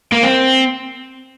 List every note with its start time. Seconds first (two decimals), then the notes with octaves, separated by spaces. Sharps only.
0.12 A#3
0.23 C4